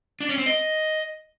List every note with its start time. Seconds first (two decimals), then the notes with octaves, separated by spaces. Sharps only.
0.21 D4
0.29 C#4
0.37 C4
0.46 D#5